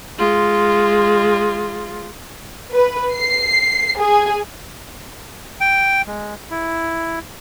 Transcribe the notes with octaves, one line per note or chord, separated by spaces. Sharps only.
G#3 F4
B4
C7
G#4
G5
G#3
E4